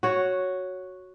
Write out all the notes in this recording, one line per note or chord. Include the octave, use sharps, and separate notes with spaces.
F#4 C#5